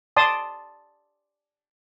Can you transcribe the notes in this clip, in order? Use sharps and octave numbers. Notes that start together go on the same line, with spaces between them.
D5 A5 C6 D#6